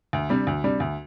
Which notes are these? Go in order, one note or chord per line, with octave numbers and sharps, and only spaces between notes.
D2
C3 G3 D4
D2
C3 G3 D4
D2